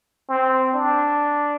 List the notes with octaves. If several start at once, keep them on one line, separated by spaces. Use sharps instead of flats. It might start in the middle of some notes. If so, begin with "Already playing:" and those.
C4
D4